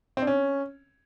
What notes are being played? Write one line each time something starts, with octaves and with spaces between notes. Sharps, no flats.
C4
D4
C#4